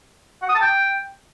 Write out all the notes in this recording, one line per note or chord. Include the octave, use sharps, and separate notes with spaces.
F#5
D#6
A5
G5